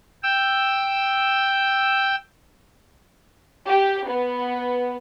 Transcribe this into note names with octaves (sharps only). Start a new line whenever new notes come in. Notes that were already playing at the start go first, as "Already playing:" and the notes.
G5 E6
G4
B3